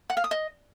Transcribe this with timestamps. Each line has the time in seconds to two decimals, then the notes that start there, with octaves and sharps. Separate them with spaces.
0.10 F#5
0.17 F5
0.24 D#6
0.31 D#5